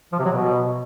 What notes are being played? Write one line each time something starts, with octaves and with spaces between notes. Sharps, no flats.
F3
C3
F#3
B2